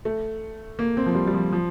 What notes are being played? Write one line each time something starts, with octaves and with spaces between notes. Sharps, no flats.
A3
A#3
C4
F3
G3
G3
F3
F3